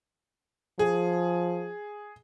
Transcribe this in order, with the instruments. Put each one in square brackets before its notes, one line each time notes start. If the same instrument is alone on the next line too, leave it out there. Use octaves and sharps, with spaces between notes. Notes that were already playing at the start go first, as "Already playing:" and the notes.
[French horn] F3 [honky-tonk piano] G#4